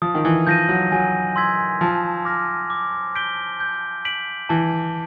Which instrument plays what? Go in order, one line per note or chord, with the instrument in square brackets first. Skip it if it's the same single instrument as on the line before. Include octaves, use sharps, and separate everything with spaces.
[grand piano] F3 [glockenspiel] D#6
[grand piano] D#3
E3
[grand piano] F3 [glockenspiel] G6 A#6 D#7
[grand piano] F#3
[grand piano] F#3 [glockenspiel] G#5
[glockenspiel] C6 E6 G#6 B6
[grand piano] F3 [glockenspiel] A5
[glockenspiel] D6 F6 A#6
D6
G6 B6 D7 G7
G6
B6 D7 F#7
[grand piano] E3 [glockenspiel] A5